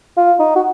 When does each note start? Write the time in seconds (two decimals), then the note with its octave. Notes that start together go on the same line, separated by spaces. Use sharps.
0.17 F4
0.40 D#4
0.56 F#4